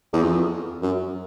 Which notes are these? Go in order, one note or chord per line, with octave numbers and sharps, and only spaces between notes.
E2
F2
F#2